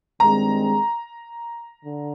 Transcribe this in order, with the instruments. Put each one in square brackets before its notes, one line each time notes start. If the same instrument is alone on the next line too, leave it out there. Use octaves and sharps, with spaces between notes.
[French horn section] G2 D#3 G#3 C4 [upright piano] A#5
[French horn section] D3